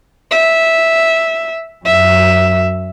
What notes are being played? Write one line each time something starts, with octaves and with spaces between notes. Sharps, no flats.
E5
F#2 E5